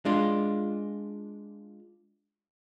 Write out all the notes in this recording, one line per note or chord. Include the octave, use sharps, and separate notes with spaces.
G#3 D4 F4